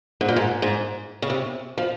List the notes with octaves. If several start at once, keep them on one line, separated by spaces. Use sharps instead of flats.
G#2
A#2
G#2
G#2
C#3
C3
F3